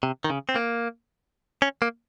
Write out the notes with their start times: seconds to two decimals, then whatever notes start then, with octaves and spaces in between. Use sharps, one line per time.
0.03 C3
0.24 D#3
0.30 C#3
0.49 C4
0.56 A#3
1.62 C#4
1.82 A#3